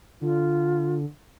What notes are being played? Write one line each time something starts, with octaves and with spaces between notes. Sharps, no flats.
D3 F4